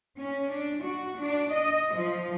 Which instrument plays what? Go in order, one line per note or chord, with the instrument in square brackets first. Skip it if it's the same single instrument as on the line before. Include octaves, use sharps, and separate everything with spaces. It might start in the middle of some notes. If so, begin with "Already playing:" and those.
[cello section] C#4
D4
F#4
D4
D#5
F3